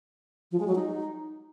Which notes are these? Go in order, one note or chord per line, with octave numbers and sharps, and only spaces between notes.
F3
G#3
F#3
D#4